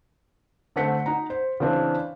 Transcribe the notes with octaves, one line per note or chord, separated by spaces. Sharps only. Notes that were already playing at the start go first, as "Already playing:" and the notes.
D3 A3 C4 F#5 B6 C#7
D#4 F#5 A#5
C5
C#3 E3 C4 D4